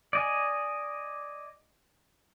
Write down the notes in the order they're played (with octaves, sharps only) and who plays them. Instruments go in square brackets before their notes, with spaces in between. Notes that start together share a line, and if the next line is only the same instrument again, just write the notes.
[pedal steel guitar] D5 D#5 G#5